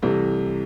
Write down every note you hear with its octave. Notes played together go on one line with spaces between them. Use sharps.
C2 C3 E3 A3